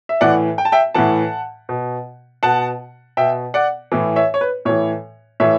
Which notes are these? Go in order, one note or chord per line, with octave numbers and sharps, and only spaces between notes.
E5
A2 E3 D5 F#5
G5
A5
E5 G5
A2 E3 F#5 A5
B2
B2 F#5 A5
B2 E5 G5
D5 F#5
A2 E3
C#5 E5
C#5
B4
A2 E3 C#5
A2 E3 C#5 E5